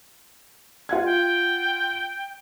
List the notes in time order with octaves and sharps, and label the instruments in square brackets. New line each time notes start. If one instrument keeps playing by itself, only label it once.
[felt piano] F4 F#5 G#6
[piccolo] G5